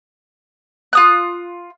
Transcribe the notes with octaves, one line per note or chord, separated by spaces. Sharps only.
F4 D#6 F#6